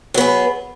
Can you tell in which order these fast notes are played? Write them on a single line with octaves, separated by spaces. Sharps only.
F#3 B3 G#4